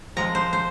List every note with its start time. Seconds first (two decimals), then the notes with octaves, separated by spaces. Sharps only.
0.17 F3 G#3 C4 A#5
0.35 C5
0.53 C5